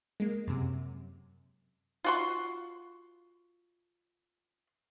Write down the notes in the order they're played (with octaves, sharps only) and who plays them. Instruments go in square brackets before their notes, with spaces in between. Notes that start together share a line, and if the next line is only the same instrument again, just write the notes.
[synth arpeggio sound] G#3 A#3
F#2 C3
[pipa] F4 F#4 C6